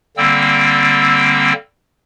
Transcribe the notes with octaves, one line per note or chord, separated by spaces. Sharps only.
D3 G3 A#3 C4 E6